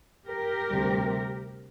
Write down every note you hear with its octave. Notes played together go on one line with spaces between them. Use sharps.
G4 A#4
D2 C3 G3